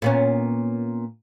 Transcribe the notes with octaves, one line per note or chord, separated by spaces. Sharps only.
A#2 B3 C#4